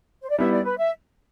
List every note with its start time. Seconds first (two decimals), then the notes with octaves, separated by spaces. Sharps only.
0.21 C5
0.29 D5
0.38 G3 B3 E4 E5
0.52 D5
0.65 B4
0.77 E5